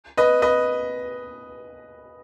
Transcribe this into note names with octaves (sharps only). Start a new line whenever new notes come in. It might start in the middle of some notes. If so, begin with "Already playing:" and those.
B4 D#5
B4 D#5